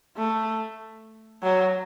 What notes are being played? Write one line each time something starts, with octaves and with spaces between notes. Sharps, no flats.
A3
F#3